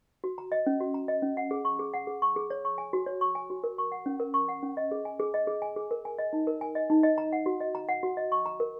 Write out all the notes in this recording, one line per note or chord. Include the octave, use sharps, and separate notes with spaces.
F#4
A#5
D#5
C#4
F#4
A#5
D#5
C#4
F#5
G#4
C#6
G#4
F#5
G#4
C#6
G#4
C#5
C#6
G#5
F#4
C#5
C#6
G#5
F#4
A#4
C#6
F#5
C#4
A#4
C#6
F#5
C#4
D#5
G#4
G#5
G#4
D#5
G#4
G#5
G#4
A#4
G#5
D#5
D#4
A#4
G#5
D#5
D#4
D#5
A#5
F#5
F#4
D#5
A#5
F#5
F#4
D#5
C#6
A#5
A#4